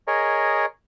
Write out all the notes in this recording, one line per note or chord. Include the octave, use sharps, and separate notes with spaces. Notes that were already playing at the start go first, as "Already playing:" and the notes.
G#4 A#4 C#5 D#5